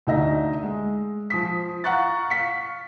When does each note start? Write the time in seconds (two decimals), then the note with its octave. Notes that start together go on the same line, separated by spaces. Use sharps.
0.07 D2 D3 D#4 D#5 E5 A#6
0.63 G#3
1.30 F3 D#6 B6
1.84 F5 F#5 A#5 C#6 F#6 A6
2.30 F5 C#6 B6 C#7